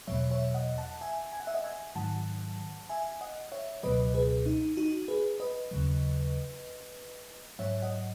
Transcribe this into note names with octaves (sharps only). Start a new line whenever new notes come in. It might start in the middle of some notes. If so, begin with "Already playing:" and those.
E2 B2 F#3 C#5 E5
C#5 E5
D#5 F#5
F#5 A5
E5 G#5
G#5
F#5
E5
D#5 F#5
E5 G#5
G#2 D#3 F#3 F#5 A5
E5 G#5
D#5 F#5
C#5 E5
C#2 B2 F#3 B4 D#5
G#4 B4
D#4
D#4 F#4
G#4 B4
B4 D#5
D#2 C#3 F#3
G#2 F#3 C#5 E5
D#5 F#5